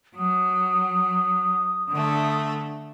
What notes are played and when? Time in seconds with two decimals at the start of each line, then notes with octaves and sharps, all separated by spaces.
0.16 F#3 D#6
1.89 D3 A3